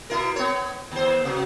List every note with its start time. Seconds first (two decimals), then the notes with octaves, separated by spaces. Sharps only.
0.10 B2 E4 A#4
0.36 B3 C#5
0.92 D#2 C5
1.25 C3 F#3